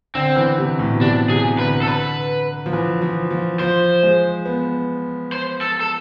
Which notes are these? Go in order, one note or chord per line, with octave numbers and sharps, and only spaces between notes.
D3 C4
E3
C3
A2
B2
C3 D4
C3 G#4
D3 B4
A4
B4
F3
E3
F3
F3
F3 C5
G#3
B3
C5
A4
A4